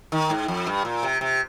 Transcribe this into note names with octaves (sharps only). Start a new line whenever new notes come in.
D#3
G#2
F2
G2
A#2
C3
C3